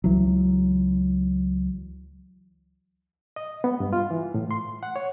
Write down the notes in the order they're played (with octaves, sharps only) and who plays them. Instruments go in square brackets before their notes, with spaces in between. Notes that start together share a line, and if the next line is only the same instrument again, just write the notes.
[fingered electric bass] C#2 E3 F#3
[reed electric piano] D#5
B3
G2
F4
E3
A2
C6
F#5
C#5